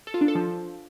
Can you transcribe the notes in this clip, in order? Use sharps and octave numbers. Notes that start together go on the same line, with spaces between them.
A4
F4
D4
A4
F3